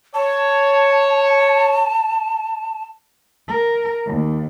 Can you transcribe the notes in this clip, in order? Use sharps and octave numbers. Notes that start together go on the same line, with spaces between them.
C#5 A5
A#4
D#2